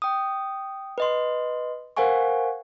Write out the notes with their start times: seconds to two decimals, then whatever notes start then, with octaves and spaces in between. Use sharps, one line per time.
0.02 G5 D#6
0.98 B4 D#5 C6
1.97 A#4 C5 F5 F#5 G#5 C#6